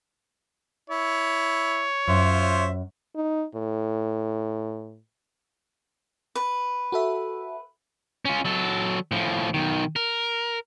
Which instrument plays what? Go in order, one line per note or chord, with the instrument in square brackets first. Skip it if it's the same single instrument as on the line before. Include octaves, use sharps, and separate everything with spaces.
[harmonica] E4 [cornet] C#5
[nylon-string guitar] F#2 [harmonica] F4 C5 E5
[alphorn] D#4
A2
[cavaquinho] B4
[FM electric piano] F#4 A4 E5
[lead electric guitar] C#4 F4
F#3 A4
A2 F3
B1 D#3
A#4